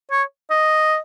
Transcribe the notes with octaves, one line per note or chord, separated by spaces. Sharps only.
C#5
D#5